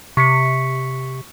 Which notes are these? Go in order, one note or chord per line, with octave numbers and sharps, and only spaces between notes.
C3 C#6 B6 C#7